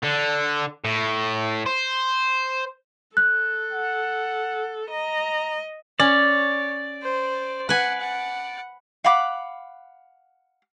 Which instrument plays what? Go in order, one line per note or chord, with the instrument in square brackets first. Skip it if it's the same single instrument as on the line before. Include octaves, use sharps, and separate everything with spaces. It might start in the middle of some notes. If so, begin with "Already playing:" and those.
[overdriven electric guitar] D3
A2
C5
[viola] A4 [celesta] F#6
[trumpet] F#5
[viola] D#5 [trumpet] A#5
[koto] C#4 [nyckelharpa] C#5 [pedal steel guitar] D5
[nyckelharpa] C5
[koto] B4 G#5 [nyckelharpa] F#5
[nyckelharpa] F#5
[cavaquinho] F5 F#5 B5 D6